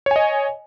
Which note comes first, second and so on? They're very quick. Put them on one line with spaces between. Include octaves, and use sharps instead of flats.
C#5 G#5 D#5